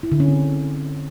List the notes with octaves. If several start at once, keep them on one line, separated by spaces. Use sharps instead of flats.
E4
D3
C#4
C4